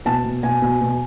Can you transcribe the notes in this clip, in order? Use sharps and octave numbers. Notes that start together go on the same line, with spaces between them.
B2 A5
B2
B2 G#5
B2
B2